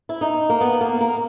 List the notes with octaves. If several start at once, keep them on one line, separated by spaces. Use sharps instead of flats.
E4
D#4
A#3
B3
A#3
A#3